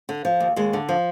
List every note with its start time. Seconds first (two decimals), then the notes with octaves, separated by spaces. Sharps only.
0.09 D3
0.25 F3
0.40 D#2
0.56 D#2 G#3
0.73 D3
0.89 F3